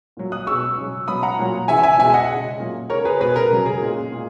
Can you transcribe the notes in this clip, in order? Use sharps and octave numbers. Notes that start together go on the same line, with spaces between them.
A#2 F#3
D#6 F#6
B2 G#3 C#6 E6
C#3 F#3
B2 F#3 B5 D#6
F#5 A#5
A#2 F#3
C#3 E3 G#3 E5 G#5
E5 G#5
B2 G#3 E5 G#5
D#5 F#5
C#3 G#3
A#2 F#3
C#3 G#3 A#4 C#5
G#4 B4
B2 G#3 G#4 B4
A#4
C#3 F#3
G#4
A#2 G#3
A#2